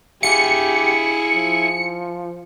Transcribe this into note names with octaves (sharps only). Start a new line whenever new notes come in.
E4 G4 G#4 F5 C#7
F3